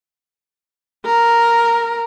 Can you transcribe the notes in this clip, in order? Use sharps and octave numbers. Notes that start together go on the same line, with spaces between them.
A#4